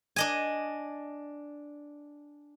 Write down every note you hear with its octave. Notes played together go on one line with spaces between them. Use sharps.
D4 D#5 G#5